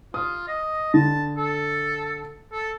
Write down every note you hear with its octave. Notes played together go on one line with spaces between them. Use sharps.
F4 D#6
D#5
D3 A5
A4
A4